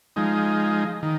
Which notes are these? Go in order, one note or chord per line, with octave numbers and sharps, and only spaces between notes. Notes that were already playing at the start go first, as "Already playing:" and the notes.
F3 G#3 D#4
D#3